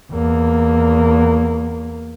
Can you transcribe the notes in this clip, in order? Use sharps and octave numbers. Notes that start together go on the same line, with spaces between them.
E2 A#3